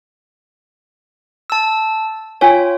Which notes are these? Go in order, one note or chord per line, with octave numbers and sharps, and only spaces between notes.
A5 E6
F4 C#5 G5 G#5